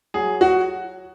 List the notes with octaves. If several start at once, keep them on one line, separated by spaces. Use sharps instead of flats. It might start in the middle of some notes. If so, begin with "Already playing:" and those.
F#3 G#4
F#4